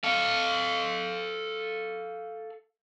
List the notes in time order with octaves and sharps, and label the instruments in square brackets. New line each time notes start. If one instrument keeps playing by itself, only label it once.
[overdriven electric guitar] A4 F5